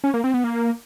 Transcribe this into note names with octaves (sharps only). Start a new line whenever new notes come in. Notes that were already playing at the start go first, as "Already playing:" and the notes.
C#4
A#3
C4
B3
A#3